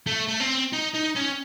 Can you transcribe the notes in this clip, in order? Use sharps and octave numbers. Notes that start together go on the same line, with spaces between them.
A3
A3
C4
D#4
D#4
C#4